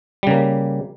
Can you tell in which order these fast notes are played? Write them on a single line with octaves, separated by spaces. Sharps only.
G3 C#3 A#3